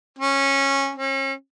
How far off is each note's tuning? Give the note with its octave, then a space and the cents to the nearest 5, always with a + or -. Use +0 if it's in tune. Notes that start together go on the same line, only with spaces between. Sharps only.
C#4 -15
C#4 -40